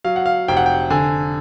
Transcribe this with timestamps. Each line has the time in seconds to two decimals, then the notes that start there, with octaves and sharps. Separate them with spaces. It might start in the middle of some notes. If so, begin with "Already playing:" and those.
0.05 F#3 F5
0.16 F#5
0.26 F5
0.48 F1 G5
0.57 F#5
0.66 G5
0.90 D3 G#5